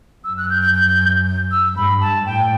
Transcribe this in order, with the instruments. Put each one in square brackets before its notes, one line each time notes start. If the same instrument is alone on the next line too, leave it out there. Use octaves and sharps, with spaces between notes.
[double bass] F#2 [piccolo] E6
[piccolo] F#6
G6
G6
G6
E6
[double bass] G2 [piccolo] B5
[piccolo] A5
[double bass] A2 [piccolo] G5